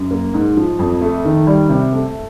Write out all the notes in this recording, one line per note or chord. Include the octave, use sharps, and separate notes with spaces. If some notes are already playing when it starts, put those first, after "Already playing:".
Already playing: F#2
A#3
G#2
F3
F2
A3
D#3
G3
C3
A3